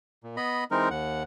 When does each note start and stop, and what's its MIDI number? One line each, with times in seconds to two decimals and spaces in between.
0.24 0.36 46
0.37 0.64 59
0.37 0.64 75
0.37 0.64 83
0.71 0.89 52
0.71 0.89 56
0.71 0.89 60
0.71 0.89 63
0.71 0.89 70
0.91 1.23 39
0.91 1.23 78